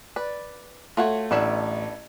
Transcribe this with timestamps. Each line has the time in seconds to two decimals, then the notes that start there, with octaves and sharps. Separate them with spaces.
0.16 B4 D5
0.97 A3 F4 F#4 C#5
1.31 A1 B3 D4 E5